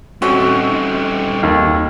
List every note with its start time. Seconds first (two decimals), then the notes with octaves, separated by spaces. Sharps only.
0.22 G3 A3 C4 C#4 D#4 F#4 D#5
1.43 D#2